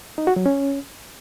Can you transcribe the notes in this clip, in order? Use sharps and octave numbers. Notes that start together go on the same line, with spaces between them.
D#4
F#4
F#3
C#4